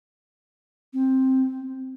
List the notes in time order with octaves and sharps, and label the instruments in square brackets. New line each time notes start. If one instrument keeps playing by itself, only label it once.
[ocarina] C4